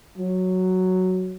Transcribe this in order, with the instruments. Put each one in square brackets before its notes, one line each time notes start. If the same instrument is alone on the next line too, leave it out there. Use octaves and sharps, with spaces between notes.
[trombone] F#3